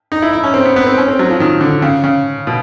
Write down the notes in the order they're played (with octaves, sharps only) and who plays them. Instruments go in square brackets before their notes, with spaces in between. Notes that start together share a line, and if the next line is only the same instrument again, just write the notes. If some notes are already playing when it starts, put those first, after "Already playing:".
[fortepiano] D#4
E4
E4
C#4
C4
B3
B3
C4
C#4
C4
F#3
F3
D#3
D3
C#3
C#3
B2